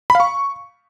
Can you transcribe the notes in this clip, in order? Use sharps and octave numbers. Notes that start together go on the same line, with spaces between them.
B5
F5
C#6